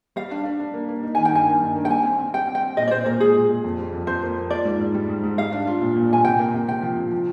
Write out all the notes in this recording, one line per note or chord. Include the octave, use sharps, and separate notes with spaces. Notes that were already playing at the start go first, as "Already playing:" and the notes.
G3 F5
D4
D4
D4
A#3
A#3
D#4
D#3 G#5
G5
G2 G#5
A#3
G2
A#3
G5
G3 G#5
C4
C4
G3 G5
C4
G5
C4
A#2 D#5
D5
A#2 C5
A#2 A#4
G#3 G#4
A#2
A#2
F2
G3
F2
F2 C5
A#3
A#3
F4 D5
G#2
G#2
G3
G#2
G#2
G3 F5
D4
F4
A#2
A#2
A#2 G#5
C3 G5
A#3
C3
C3 G5
F3
C3
F3